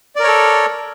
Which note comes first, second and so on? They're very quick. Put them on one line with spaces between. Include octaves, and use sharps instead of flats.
D5 A#4 C#5 A4